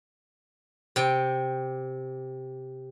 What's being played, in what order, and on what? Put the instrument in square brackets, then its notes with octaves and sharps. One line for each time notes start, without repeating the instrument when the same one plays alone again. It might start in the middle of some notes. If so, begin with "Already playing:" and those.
[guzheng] C3 G5